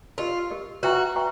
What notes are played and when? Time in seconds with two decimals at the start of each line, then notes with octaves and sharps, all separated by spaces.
0.18 F4 G4 A#4 D#5
0.51 G4 A#4 D#5
0.83 F#4 B4 E5 G5 A#5 C#6
1.16 B4 E5 G5 A#5 C#6